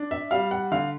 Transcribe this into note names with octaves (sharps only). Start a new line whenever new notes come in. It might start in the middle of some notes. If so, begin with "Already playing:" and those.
Already playing: D4
E5
G3 F5
F#5
D3 F5